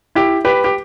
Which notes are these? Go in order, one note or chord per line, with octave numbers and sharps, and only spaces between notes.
E4 G4
G4 B4
G4